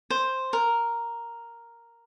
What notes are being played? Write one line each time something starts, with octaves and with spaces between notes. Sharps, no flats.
C5
A#4